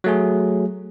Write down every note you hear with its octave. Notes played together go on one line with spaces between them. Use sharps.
F#3 A3 G#4